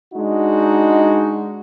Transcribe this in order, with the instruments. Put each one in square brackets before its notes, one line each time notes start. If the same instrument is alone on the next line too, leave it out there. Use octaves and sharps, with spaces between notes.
[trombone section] G#3 D4 D#4 F#4